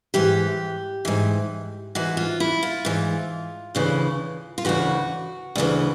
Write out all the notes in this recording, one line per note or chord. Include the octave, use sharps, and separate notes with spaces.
G#2 E3 G4
G#2 E3
G#2 E3 F#4
F4
E4
F4
G#2 E3
D2 C#3 E3
F4
D2 C#3 E3 F#4
D2 C#3 E3